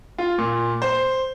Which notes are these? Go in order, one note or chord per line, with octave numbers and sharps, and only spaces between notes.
F4
A#2
C5